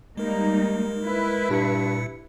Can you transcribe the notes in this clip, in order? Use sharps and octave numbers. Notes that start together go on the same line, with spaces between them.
G3 G#3 A#3 D#4 A#4
E4 B4
G2 A#2 C#7